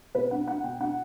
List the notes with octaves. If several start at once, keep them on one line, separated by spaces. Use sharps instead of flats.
B2 B4
D4 F#5
D4 F#5
B2 G5
D4 F#5